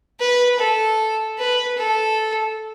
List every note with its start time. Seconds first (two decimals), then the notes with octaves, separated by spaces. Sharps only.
0.20 B4
0.59 A4
1.38 B4
1.77 A4